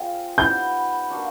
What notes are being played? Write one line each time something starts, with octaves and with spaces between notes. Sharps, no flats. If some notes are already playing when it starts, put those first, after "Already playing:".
Already playing: G#3 C4 F4
G3 B3 D#4 G6
A#3 D4 F#4